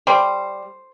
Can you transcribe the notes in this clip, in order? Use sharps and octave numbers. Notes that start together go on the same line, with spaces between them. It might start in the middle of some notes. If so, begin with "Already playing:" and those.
G3 C5